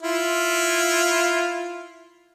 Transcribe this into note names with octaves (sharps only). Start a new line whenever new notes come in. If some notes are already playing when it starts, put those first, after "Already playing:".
E4 F4